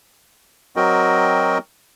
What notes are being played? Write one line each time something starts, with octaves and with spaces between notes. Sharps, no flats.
F#3 C4 F#4 A#4 D#5 G5